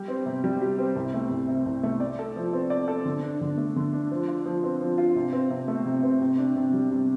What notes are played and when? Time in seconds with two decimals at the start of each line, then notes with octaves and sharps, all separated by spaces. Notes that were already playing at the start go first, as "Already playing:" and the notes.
Already playing: G3 G4
0.08 C4
0.26 C3
0.44 G3
0.61 G4
0.78 C4
0.96 C2
1.14 A3
1.31 C2
1.48 C3
1.66 C2
1.83 A3
2.00 D5
2.19 A4
2.36 F3
2.53 C4
2.70 D5
2.88 A4
3.05 D3
3.23 D4
3.41 D3
3.58 A3
3.76 D3
3.93 D4
4.11 F3
4.28 F4
4.46 F3
4.64 C4
4.81 F3
4.98 F4
5.16 C3
5.33 C4
5.50 C3
5.68 A3
5.86 C3
6.03 C4
6.21 C3
6.38 D4
6.56 C3
6.73 G3
6.91 C3